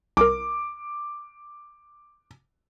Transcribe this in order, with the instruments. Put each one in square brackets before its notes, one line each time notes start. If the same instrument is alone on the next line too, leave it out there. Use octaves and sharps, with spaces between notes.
[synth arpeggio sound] C2 A#4 [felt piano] D6